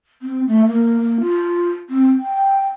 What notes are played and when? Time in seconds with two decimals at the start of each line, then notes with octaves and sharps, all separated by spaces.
0.22 C4
0.47 A3
0.67 A#3
1.20 F4
1.90 C4
2.19 G5